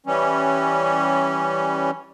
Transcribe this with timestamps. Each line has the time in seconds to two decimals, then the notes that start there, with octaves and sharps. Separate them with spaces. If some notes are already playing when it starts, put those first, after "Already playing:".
0.06 E3 G3 C#4